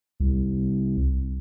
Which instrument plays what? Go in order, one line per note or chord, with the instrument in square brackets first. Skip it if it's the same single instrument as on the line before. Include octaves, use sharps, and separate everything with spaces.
[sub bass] C2